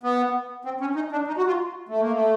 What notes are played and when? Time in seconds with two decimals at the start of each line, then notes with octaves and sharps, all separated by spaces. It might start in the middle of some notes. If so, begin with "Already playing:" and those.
0.03 B3
0.65 C4
0.81 C#4
0.95 D#4
1.12 D4
1.27 D#4
1.37 F#4
1.47 F4
1.89 A3
2.00 A#3
2.13 A3